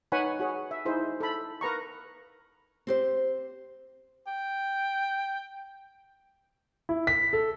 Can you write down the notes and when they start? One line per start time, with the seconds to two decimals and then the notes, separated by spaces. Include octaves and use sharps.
0.12 D#4 B4 C#5 F#5 G#5 B5
0.40 F#4 G#4 C#5
0.71 E5
0.85 D#4 E4 G#4 C5
1.20 A4 B5
1.61 A#4 B4 A#5 C#6
2.87 C4 G4 C5
4.27 G5
6.89 E4
7.07 B6
7.33 A4